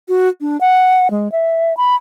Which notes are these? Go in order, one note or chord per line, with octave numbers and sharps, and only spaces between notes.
F#4
D4
F#5
G#3
E5
B5